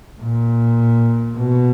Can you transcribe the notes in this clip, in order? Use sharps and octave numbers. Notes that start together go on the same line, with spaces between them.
A#2
B2